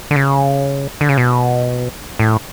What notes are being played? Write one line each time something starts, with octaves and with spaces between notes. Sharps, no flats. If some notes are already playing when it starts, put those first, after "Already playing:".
D3
C#3
D3
C#3
B2
A2